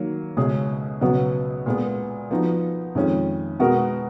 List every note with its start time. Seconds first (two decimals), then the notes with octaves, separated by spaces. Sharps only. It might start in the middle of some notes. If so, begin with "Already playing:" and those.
Already playing: D#3 F#3 A#3
0.37 C#2 B2 G#3 C#4 G#4
1.01 C#2 B2 F#3 B3 F#4
1.66 A#2 G#3 B3
2.31 F3 B3 D#4 F#4
2.95 F2 D#3 G#3 C#4 F4
3.60 B2 G#3 B3 F#4 A#4